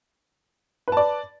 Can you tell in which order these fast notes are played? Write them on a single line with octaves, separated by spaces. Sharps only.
B4 A5 D5